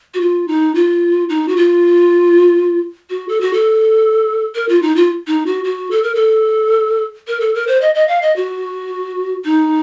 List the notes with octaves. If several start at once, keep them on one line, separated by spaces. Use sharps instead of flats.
F#4
F4
D#4
F4
D#4
F#4
F4
F#4
A4
F#4
A4
A#4
F4
D#4
F4
D#4
F#4
F#4
A4
A#4
A4
A#4
A4
A#4
C5
D#5
D#5
F5
D#5
F#4
D#4